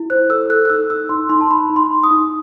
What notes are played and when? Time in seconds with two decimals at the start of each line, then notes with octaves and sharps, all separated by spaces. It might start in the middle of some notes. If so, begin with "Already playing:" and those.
Already playing: E4
0.10 C5 F#6
0.30 A4 E6
0.49 A4 F#6
0.65 F#6
0.70 D#4 E6
0.90 D#4 E6
1.09 D#4 C6
1.29 D#4 C6
1.41 A5
1.51 D#4 B5
1.70 D#4
1.76 C6
1.90 D#4
2.04 D#6
2.11 D#4